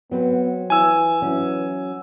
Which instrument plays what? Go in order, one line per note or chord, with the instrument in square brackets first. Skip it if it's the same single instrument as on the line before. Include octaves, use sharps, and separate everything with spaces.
[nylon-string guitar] F#3 C4 B4 [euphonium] B3
[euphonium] E3 [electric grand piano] G#5 E6
[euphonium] E3 [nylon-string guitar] F#3 C#4